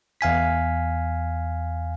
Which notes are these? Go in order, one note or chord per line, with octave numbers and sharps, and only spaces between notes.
E2 F5 G#5 B6